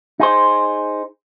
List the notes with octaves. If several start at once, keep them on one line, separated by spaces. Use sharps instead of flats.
D#4 G#4 C5